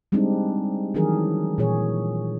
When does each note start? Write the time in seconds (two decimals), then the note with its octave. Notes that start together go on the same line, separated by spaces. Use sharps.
0.12 G3 G#3 C4 D4 D#4
0.94 D#3 E3 F#3 D4 G#4 A#4
1.58 A#2 E3 G#4 C#5